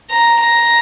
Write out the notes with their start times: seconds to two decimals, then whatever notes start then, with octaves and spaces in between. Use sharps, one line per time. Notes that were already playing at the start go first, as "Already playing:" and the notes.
0.10 A#5
0.40 A#5